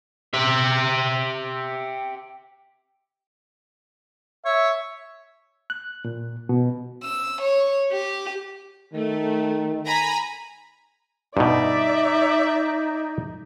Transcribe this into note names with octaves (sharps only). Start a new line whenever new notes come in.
G4 E5
C#5 E5
F#6
A#2
B2
E6
C#5
G4
D#3 A3
G#5 A#5 B5
G2 B2 D#4 D5 E5